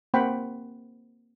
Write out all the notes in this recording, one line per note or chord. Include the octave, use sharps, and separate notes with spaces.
A#3 C4 C5 F#5 G5 B5